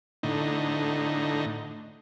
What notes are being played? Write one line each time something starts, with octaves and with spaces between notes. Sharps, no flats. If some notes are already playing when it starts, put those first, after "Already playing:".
A2 D3 D#4